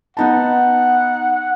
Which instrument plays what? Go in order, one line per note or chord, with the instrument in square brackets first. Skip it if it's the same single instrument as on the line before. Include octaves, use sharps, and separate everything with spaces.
[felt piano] B3 D#4 A5 [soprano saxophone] F#5